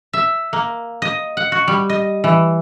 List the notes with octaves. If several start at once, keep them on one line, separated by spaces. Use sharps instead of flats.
E5
A#3
D#5
F#5
F#4
G3
D#5
E3